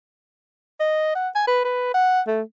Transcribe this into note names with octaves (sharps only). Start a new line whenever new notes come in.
D#5
F#5
G#5
B4
B4
F#5
A3